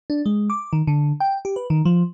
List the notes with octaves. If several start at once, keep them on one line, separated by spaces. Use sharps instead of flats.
D4
G#3
D6
D#3
D3
G5
G4
B4
D#3
F3